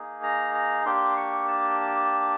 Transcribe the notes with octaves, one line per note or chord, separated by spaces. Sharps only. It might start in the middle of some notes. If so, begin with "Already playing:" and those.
Already playing: A#3 D#4 G#4
A#5
A#5
A#3 D4 G4 C6
C#6
A5